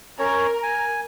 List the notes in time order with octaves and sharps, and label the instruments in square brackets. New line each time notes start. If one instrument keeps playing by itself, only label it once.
[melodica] C#4 C#5 [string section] A#4
[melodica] G#5